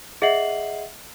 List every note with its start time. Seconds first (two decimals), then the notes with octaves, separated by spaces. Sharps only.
0.22 G#4 D#5 E5 F#5 C7 F#7